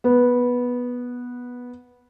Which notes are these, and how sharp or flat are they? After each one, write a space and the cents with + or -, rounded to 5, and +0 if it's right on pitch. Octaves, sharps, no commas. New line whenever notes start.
B3 -10